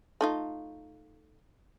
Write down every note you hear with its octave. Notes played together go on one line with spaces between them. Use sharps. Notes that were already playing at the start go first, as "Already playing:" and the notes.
A3 D#4 F4